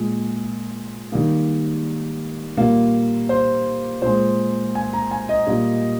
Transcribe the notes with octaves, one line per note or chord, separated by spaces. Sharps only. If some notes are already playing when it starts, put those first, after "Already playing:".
Already playing: A#2 G#3
D#3 G3 A#3
A#2 G3 A#3
C5
A#2 G#3 C5
G#5
A#5
G#5
D#5
A#2 G3 A#3